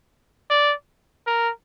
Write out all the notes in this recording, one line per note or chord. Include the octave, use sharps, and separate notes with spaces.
D5
A#4